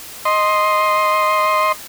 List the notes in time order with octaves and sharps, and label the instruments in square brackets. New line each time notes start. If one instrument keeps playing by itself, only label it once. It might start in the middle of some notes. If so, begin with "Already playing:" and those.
[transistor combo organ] D#5 C6